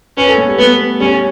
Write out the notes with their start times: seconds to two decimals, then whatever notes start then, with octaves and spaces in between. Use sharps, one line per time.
0.17 C#4 B4
0.28 A4
0.38 B3
0.49 G3
0.58 A3 B3
1.00 G3 C#4